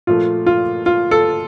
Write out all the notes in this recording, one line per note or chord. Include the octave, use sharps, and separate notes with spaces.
A#2 F3 A3 F4
F4
F4
A4